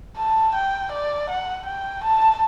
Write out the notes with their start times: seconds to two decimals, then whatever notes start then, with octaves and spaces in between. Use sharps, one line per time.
0.18 A5
0.55 G5
0.92 D5
1.30 F#5
1.66 G5
2.04 A5